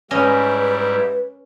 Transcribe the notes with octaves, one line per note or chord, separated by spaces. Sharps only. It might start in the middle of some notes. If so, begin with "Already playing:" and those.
G#2 G3 C#4 E4 B4 D#5